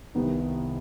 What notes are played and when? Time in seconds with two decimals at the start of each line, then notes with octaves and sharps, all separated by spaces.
0.15 C2 C3 D#3 B3 D#4